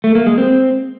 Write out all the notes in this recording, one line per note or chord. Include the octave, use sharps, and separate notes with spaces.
A3
A#3
G#3
C4